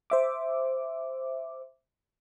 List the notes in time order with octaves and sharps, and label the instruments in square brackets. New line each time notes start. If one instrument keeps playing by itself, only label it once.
[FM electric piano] C5 E5 D6